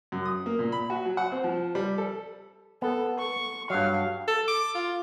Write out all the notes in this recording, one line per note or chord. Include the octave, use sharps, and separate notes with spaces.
F#2
D#6
A#3
A#2
B5
F#4
F#3
F#5
C4
F3
G3
A4
B3 A4
C#6
G2 F#3 F5
A4
D6
F4